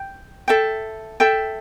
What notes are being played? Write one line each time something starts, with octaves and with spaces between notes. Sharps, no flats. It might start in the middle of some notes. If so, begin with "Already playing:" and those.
Already playing: G5
A4 E5 G5
A4 E5 G5